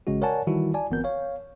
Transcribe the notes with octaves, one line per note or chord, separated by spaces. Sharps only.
A1 C#3 G#3 C#4 F#4
A#4 C#5 D5 F#5 G#5 A5
D#3 E3 G3 E4 F#4
D5 G#5 A5
G1 E3 B3 C4 A#4 G6
C#5 F5